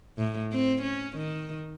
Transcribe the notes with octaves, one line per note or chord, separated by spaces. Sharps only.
A2
C4
C#4
D#3